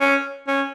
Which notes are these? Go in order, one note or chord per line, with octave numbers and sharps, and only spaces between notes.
C#4
C#4